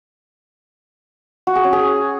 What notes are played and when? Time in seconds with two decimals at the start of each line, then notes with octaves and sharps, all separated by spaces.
1.47 F#4
1.56 G#4
1.64 C#4
1.73 G#4